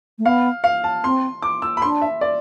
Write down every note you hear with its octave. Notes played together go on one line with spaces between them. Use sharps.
A3
B3 F5
F5
A5
C4 C6
D6
E6
B5
D4 C6
E5
D5